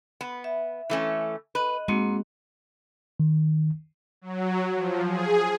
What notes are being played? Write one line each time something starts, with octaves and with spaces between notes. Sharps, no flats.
B3
E5
E3 A3 C#4
B4 D#5
G#2 G#3 A#3 C4 F#4
D#3
F#3
F3
G#4